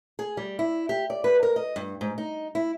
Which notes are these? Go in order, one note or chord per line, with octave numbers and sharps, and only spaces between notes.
G#4
G3
E4
G4
D5
B4
A#4
D#5
G2
G#2
D#4
E4